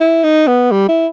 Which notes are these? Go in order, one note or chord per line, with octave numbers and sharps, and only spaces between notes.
E4
D#4
B3
G3
E4